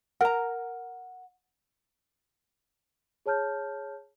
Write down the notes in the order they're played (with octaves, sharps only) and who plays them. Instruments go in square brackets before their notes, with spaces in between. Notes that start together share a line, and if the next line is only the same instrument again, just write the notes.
[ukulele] A#4 A#5 [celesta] F#5
[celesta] G#4 C#5 A5 F6 G6